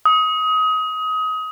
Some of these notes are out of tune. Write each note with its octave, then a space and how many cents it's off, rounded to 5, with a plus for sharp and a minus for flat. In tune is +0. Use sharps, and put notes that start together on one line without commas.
D#6 +25